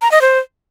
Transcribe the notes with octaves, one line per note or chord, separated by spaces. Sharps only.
A#5
D#5
C5